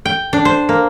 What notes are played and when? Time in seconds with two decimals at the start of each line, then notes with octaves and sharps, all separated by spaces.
0.05 G5
0.33 D4
0.45 C5
0.69 A#3